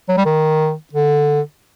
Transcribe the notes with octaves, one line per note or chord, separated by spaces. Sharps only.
F#3
G3
D#3
D3